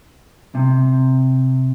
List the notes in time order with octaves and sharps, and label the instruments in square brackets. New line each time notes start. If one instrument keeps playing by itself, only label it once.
[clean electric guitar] C3